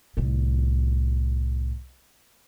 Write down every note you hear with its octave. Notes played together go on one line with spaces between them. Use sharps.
C2 A2